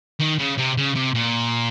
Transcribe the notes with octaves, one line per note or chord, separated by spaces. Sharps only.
D#3
C#3
C3
C#3
C3
A#2